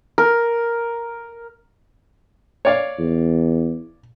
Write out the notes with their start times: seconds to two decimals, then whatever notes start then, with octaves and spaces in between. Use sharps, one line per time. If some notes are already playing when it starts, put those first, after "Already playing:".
0.18 A#4
2.65 C#5 D5 F5
2.99 E2